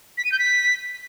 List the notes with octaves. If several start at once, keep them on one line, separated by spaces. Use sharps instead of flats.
B6
D#7
G6
B6